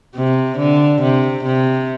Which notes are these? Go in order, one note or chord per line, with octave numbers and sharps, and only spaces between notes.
C3
D3
C3
C3